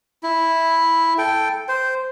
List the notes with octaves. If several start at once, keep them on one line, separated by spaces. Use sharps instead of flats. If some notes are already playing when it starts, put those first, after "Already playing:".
E4
A4 G5
C5